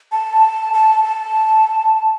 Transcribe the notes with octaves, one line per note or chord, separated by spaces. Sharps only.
A5
A5
A5